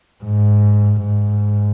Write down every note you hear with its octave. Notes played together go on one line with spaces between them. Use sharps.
G#2
G#2